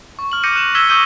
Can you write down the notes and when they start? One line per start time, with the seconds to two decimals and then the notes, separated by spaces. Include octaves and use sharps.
0.19 C#6
0.32 F6 F#7
0.43 D6 F6 G6 A#6 C#7 D#7
0.56 F#6 E7
0.75 E6 G#6 A#6 B6 E7 G7
0.89 C#6 D#6 E6 G6 D#7 G7